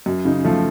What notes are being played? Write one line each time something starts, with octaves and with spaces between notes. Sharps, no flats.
F#2
C#3 D#4
F3 A3